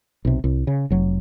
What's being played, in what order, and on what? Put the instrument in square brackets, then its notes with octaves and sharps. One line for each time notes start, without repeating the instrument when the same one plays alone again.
[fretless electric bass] B1 C3
C2
C#3
F1 F#3